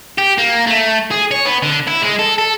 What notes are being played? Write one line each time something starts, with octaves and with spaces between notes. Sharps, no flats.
G4
A#3
A3
G#4
C#5
B3
D3
E4
G#3
A4
A4